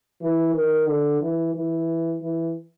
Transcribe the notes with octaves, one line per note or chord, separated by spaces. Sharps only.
E3
D#3
D3
E3
E3
E3